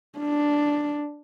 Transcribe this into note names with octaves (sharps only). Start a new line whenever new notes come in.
D4